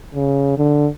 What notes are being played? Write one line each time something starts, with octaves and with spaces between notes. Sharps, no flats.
C#3
D3